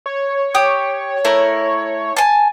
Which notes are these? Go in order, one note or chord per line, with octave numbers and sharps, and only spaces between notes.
C#5
G4 G5 D#6
A3 E4 A#4
G#5 A5